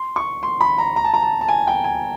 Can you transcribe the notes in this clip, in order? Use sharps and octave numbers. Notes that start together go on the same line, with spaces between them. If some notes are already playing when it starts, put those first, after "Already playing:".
Already playing: C6
C#6
C6
B5
A#5
A#5
A5
A#5
A5
A5
G#5
G5
G#5